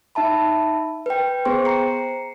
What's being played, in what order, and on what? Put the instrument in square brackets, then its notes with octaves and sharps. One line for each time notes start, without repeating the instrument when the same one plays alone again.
[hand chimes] D#4 E5 A5 B5
B4 G5
B3 G#4 C5 G5 C6
A#5 C7 C#7